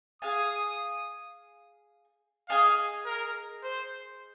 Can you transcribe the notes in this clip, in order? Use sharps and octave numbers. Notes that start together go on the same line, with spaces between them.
G#4 F5 G#5 D#6
G#4 D#5 F5 G#5
A#4
C5